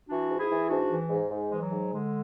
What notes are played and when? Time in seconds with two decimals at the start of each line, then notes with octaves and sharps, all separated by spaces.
0.08 E3 D4 F#4
0.28 G#2
0.39 E4 G#4
0.49 E3
0.69 G#2 D4 F#4
0.90 E3
1.09 G#2
1.30 G#2
1.50 E3 G#3
1.61 F#3
1.70 G#2
1.91 D3 G#3